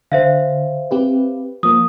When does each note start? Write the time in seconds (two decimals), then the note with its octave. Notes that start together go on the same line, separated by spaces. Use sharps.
0.12 D3 C5 E5 F5
0.91 C4 G4 B4
1.63 F3 A#3 D#6